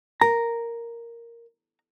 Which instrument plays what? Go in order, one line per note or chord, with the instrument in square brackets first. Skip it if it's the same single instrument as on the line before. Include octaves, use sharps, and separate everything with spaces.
[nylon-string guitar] A#4 [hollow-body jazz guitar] A#5